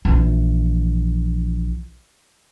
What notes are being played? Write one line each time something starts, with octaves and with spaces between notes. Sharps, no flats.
A#1 E3